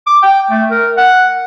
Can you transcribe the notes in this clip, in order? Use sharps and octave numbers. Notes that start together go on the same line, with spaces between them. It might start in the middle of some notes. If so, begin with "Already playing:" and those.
D6
G5
A3
A#4
F#5